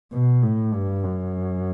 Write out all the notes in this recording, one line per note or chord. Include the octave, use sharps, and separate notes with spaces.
B2
A2
G2
F#2